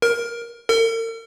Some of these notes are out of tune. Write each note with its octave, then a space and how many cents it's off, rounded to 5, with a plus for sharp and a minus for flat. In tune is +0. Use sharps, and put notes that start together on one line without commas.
A#4 +15
A#4 -45